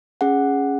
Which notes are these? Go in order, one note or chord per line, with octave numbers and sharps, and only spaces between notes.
C#4 G#4 F#5